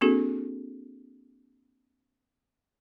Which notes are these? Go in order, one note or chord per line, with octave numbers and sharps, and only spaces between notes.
A#3 C4 D4 F#4 G#4 A4